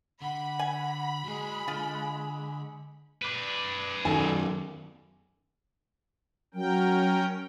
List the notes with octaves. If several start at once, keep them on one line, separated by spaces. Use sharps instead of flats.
D3 F#5 B5
G#5
F#3 G#3 G#4
D3 F4
B4 D5
F#2 D#3 A4 G#5
F#3 C#4 A#4 G5